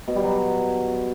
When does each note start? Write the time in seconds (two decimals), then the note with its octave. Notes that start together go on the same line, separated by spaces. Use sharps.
0.08 B2
0.15 G3
0.23 F#3